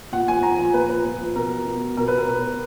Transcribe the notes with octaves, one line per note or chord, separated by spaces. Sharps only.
A#2 F#5
F3 G#5
A#2 A#5
F3
A#2 B4
F3 B4
A#2
F3
B2 A#4
B2
B2 A#4
B4
A#4
B2 B4